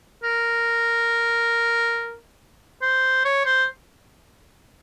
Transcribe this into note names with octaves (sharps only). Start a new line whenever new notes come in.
A#4
C5
C#5
C5